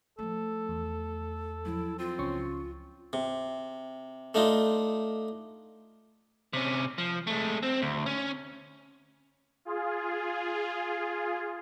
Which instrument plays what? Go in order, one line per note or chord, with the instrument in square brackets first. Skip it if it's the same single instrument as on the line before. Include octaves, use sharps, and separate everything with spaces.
[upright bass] F3 A3 [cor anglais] A4
[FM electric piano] E2
[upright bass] F3 F#3 [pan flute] E4
[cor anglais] C4 [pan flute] F4
[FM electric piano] C#2 C#4 C#6
[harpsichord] C3
A3 D4 D#4 F4
[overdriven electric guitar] C3 C#4
F3
G#3 A3
C4
D2
C#4
[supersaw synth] F4 G#4